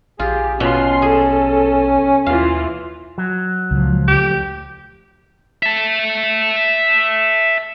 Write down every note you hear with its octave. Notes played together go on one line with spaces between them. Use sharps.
A#1 F4 G4 G#4
B2 C#4 F4 C6
G#4 A4
D#2 E3 F4 F5
F#3
C#2 A#2 F3
D2 G4
E5 A5